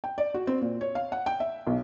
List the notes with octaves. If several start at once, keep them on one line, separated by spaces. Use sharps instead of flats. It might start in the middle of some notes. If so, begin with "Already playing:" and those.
G5
D5
F#4
C4
A#2
C#5
F5
F#5
G5
E5
B1